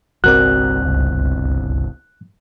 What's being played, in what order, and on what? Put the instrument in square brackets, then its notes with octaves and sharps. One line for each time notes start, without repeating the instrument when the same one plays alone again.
[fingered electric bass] G1 C2 C4 [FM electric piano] F#4 A#4 D5 [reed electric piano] F#6
[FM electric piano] C#2